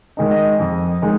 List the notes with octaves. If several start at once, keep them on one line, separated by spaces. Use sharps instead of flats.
D#3 G#3 D#4
D#5
F2
D#3 G#3 D#4